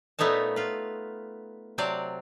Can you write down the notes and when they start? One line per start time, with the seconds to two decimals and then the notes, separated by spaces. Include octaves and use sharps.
0.19 A#2 A3 B3 D#4 C#5 A5
0.56 F4 B4
1.78 C3 F#3 C4 D5 A5